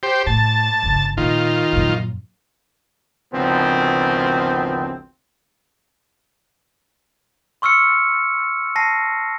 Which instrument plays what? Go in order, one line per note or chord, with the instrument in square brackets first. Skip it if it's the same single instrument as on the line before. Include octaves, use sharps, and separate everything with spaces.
[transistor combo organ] G4 C5
[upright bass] A2 [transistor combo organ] A5
[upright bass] G1 C#3
[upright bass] A#2 [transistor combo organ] D#3 F4
[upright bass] F#2 A#2
[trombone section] G#1 D2 C#3 F3 B3 C4
[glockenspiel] C6 C#6 E6 F6 C#7
A5 A#6 C7